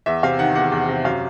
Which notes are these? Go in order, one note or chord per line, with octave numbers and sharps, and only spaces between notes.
E2 E5
C3 F5
D#3 F#5
E2 F#5
E2
C3
F#2 F5